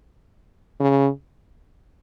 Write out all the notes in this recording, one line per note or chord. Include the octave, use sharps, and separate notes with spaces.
C#3